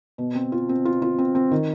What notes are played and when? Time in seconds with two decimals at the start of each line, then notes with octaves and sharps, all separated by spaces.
0.18 B2
0.35 C4
0.52 F4
0.69 C4
0.85 F4
1.02 F4
1.18 C4
1.35 C4
1.51 D#3